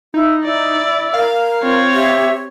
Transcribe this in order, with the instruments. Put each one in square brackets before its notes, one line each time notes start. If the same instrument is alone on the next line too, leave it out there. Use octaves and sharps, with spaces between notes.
[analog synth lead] D#4 [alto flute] E4
[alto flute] E4 [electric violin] D5
[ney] A#4 [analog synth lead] F5
[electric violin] C4 C#5 [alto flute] F4
[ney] G4 [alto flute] E5